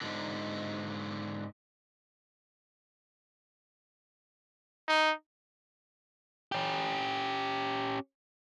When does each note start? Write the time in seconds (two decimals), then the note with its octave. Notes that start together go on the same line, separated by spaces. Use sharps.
0.01 G#2 D3
4.88 D#4
6.52 C#4 G4